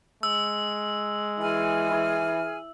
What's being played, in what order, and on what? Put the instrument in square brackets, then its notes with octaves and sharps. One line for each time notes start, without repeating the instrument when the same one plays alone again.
[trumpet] G#3 [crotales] E6
[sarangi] E3 [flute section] G#4 G#5 F6